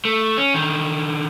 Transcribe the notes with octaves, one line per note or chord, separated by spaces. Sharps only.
A3
C#4
D3 D#3